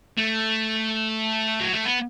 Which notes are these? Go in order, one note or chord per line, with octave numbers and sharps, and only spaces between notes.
A3
F#3
A3
B3